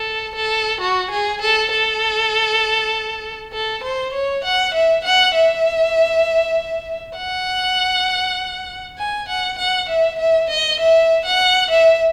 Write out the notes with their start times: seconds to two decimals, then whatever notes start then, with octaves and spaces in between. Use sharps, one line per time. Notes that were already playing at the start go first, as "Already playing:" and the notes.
Already playing: A4
0.35 A4
0.81 F#4
1.11 G#4
1.41 A4
1.71 A4
3.53 A4
3.83 C5
4.14 C#5
4.44 F#5
4.74 E5
5.05 F#5
5.35 E5
7.17 F#5
8.98 G#5
9.29 F#5
9.58 F#5
9.89 E5
10.19 E5
10.50 D#5
10.80 E5
11.25 F#5
11.71 E5